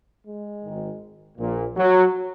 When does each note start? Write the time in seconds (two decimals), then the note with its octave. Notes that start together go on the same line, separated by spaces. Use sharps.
0.26 G#3
0.63 G#1 G#2 D#3
1.38 A#1 A#2
1.77 F#3